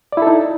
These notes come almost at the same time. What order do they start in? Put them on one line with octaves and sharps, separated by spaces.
D5 E4 A4 D#4